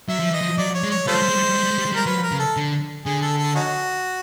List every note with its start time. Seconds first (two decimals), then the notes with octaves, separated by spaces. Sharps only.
0.09 F#3 E5
0.20 F3
0.31 E3 D#5
0.41 F3
0.58 F#3 D5
0.74 C#5
0.84 G#3
0.91 C#5
1.07 G3 F4 A4 C5
1.15 G#3
1.22 G3
1.29 G#3
1.36 G3
1.43 G#3
1.50 G3
1.58 G#3
1.64 G3
1.71 G#3
1.78 G3
1.86 G#3
1.92 G3
1.96 A#4
2.06 F#3 B4
2.23 A#4
2.32 C#3
2.40 A4
2.57 D3
3.06 D3 G#4
3.22 A4
3.38 A4
3.55 C#4 D#4 F#4